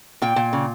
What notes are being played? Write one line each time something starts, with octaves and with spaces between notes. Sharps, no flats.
A#2 G5
A#2
C#3